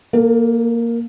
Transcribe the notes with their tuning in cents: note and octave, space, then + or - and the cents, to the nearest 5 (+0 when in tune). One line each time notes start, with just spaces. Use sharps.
A#3 +0 A4 +35